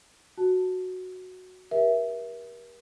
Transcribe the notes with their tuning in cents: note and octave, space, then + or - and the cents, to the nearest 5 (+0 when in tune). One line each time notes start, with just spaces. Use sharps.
F#4 -5 A5 +0
G4 +0 A#4 +40 E5 +0